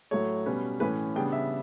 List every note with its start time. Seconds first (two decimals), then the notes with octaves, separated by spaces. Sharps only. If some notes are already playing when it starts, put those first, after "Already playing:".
0.11 A2 F#3 A3 C#5
0.46 B2 G3 C#4 B4
0.80 A2 E3 A3 C#4 B4
1.16 C#3 G3 B3 D4 G5
1.32 E5